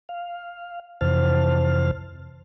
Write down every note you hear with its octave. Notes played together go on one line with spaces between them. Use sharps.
F5
F2 C3 E3 C5 A5 F6